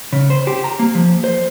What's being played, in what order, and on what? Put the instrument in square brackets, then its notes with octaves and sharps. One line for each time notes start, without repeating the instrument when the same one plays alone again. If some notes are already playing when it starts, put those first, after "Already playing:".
[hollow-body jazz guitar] C#3
C5
G4
A#5
A#3
F3
C5